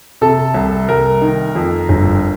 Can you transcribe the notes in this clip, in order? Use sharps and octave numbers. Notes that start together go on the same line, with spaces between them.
C3 A4
C2
C2 A#4
D#3
F2
G1